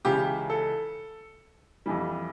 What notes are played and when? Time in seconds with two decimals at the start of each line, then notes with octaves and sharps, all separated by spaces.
0.05 C#2 C#3 E3 G4
0.50 A4
1.86 F2 E3 G3